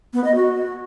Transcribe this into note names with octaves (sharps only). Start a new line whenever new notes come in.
B3
D#5
F#4